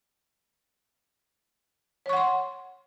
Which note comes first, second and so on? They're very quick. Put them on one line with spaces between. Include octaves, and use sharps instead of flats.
C#5 C#6 F#5 C6